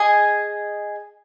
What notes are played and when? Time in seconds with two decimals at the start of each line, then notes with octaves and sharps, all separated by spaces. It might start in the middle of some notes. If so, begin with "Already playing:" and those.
Already playing: G#4 D#5 G#5